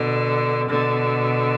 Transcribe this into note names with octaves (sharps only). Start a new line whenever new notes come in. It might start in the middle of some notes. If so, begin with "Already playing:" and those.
Already playing: B2 D3
B2 D3